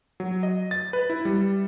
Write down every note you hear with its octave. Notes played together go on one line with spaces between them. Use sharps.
F#3
D#5
A6
B4
E4
G3